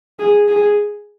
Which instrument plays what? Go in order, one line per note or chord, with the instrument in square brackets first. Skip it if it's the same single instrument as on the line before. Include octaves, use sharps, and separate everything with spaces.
[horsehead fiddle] G#4
G#4